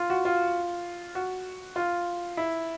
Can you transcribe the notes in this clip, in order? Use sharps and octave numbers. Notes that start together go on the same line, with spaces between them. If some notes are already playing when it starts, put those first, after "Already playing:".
Already playing: F4
F#4
F4
F#4
F4
E4